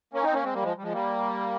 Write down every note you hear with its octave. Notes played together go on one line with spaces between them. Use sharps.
A#3 C#4
C4 D#4
A#3 C#4
G#3 C4
G3 A#3
F3 G#3
G3
F3 G#3
G3 A#3